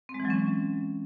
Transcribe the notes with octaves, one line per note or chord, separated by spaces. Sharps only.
C4
G#3
E3
F#3
C#4